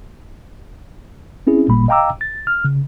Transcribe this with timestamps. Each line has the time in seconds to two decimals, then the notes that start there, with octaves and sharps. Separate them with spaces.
1.47 C4 C#4 E4 G#4
1.68 G#1 A#2 G3 A#3 B5
1.88 D#5 F5 G5 A#5 D6 E6
2.21 A6
2.47 F6
2.65 C#3